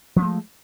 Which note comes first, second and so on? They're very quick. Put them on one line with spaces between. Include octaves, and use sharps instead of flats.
F3 C#4 A3 G#3